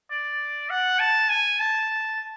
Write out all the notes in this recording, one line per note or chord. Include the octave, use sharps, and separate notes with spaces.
D5
F#5
A5
G#5
A5